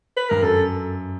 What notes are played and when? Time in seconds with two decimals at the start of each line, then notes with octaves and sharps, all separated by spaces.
0.17 B4
0.30 G2 A#4
0.42 F#2 A4